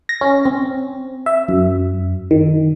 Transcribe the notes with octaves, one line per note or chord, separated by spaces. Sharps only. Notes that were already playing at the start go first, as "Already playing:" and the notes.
A#6
C#4
C4
E5
F#2
D#3